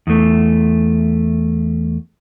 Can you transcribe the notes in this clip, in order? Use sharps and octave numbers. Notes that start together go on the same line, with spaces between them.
E2 A3